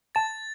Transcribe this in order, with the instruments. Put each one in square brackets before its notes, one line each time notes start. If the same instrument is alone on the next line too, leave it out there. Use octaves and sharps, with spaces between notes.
[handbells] A5 [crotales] A6